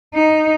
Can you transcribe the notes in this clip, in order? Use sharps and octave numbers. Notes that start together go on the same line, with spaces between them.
D#4